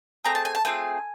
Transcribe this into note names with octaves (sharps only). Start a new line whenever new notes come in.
A3 C4 G#4 A#5
A5
G#5
A5
A3 C4 F4 G#4 G#5